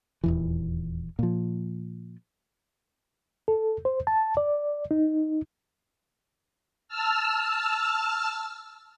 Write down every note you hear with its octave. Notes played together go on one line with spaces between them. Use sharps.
D#1 E2 E3
A#2 F3
A4
C5
A5
D5
D#4
A5 E6 F6